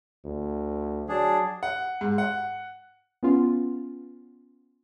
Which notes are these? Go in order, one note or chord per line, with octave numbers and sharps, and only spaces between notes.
D2
F#3 D4 G#4
F#5
G#2
F#5
B3 C#4 F4